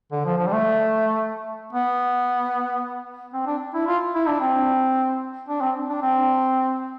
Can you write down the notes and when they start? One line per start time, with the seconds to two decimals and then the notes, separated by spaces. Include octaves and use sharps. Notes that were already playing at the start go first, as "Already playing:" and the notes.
0.12 D3
0.25 F3
0.38 F3
0.47 G3
0.52 A3
1.73 B3
3.34 C4
3.47 D4
3.74 E4
3.87 F4
4.15 E4
4.27 D4
4.40 C4
5.49 D4
5.61 C4
5.89 D4
6.02 C4